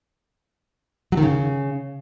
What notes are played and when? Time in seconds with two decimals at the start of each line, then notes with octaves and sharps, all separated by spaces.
1.12 F#3
1.17 D#3
1.23 C#3